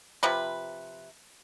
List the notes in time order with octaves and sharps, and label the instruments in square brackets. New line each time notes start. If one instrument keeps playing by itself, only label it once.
[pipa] C3 F3 B4